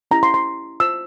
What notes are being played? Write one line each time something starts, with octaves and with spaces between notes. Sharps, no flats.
C#4 E4 G4 A#5
C6
C6
F4 C5 E6